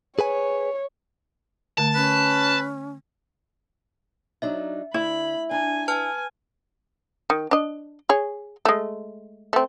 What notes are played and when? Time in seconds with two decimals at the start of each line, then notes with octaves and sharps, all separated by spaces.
0.19 G#4 B4 C#5 G#5
1.78 D3 A3 A5
1.95 C#4 B4
4.42 F#3 D4 D#4 E5
4.94 D2 E4 B5
5.51 D4 G#5 A#5
5.88 B4 G#5 A5 F6
7.30 D#3
7.51 D4 D#5
8.09 G#4 C#5
8.65 G#3 A3
9.53 A3 C4